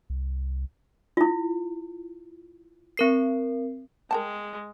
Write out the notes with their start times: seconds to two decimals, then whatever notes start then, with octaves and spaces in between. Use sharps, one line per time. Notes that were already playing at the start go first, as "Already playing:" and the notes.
0.10 C2
1.17 E4 F4
2.97 C4 A#4 C7
4.11 G#3 A#4 G5 A5